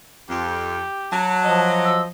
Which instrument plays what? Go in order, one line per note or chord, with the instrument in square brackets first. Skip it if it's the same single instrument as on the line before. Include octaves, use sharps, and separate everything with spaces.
[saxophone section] F2 [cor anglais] G4
[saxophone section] F#3 [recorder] A5
[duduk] F3 [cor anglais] D#5
[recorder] E6